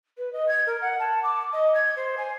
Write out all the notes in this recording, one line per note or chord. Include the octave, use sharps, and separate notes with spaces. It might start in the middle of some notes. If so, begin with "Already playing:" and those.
B4
D#5
G#6
A#4
F#5
A5
D6
D#5
G#6
C5
G#5